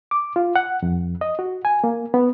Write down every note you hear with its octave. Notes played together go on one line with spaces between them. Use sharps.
D6
F4
F#5
F2
D#5
F#4
G#5
A#3
B3